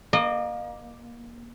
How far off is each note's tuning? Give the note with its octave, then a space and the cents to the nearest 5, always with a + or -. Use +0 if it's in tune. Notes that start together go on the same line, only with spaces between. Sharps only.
A#3 +20 D#5 -30